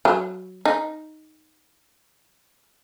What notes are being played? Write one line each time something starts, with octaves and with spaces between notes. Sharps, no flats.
F#3
D#4